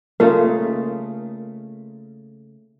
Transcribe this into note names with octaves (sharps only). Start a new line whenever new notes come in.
C#3 A3 A#3 D#4 F4 A#4